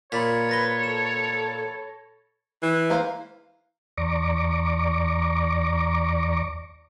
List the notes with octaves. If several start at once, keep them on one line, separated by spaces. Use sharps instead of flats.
A#2 C#5 B5 A6 B6
B4 A6 A#6 G7
A4 E7
E3
A#3 C5 F5
E2 D5 A#5 C#6 D6